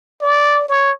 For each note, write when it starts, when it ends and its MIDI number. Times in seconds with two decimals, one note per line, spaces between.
0.22 0.64 74
0.69 0.91 73